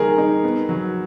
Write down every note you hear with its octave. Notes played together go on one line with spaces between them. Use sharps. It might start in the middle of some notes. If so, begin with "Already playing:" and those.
Already playing: D#3 G3 A#3 G#4 A#4
D#4
B3
F#3